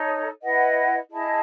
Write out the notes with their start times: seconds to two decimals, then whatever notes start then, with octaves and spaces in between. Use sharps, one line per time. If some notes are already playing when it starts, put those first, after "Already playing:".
Already playing: D#4 A4 C#5
0.42 E4 B4 D#5 F#5
1.11 E4 G#4 D#5 A5